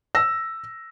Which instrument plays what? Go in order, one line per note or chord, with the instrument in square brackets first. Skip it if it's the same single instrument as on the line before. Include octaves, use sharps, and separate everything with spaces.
[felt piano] E6 A#6